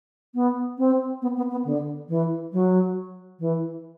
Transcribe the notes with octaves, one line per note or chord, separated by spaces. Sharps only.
B3
C4
B3
B3
B3
D3
E3
F#3
E3